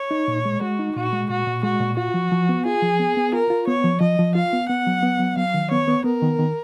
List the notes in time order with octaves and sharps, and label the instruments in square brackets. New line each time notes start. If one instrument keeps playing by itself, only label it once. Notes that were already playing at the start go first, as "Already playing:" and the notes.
Already playing: [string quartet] C#5
[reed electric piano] D#4
A#2
G#3
[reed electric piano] G#3 [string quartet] F#4
[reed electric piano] D#4
[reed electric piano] A#2 [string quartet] F#4
[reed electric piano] G#3
[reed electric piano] A#2 [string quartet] F#4
[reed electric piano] A#2
[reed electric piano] G#3 [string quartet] F#4
[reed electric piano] A#2
[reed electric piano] F4 [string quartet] F#4
[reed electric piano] F3
F3
B3
[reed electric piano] F4 [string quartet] G#4
[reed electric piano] F3
B3
B3
[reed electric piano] F4 [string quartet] A#4
[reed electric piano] F4
[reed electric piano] B3 [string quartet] C#5
[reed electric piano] F3
[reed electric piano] F3 [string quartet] D#5
[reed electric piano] F3
[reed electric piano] F4 [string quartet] F5
[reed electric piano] B3
[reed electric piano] B3 [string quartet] F#5
[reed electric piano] F#3
B3
F#3
[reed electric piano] F#3 [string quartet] F5
[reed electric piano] D#3
[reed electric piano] B3 [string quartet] C#5
[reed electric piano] B3
[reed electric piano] B3 [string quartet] A#4
[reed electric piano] D#3
D#3